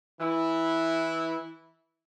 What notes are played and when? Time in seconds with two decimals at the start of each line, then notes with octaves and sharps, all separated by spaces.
0.20 E3 E4